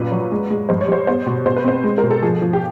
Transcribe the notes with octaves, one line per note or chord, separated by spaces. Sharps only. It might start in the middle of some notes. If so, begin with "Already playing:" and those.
Already playing: F#2 A#2 B4
F#3
G#3
G#3
G2 C5
C#5
G3 C5
B3 C5
B2
B2 C5
B4
C4 C5
G#3
B2 A#4
A4
F3 G#4
F3
G4